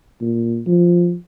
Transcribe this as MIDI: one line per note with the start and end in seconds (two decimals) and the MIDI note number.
0.21 0.61 46
0.67 1.15 53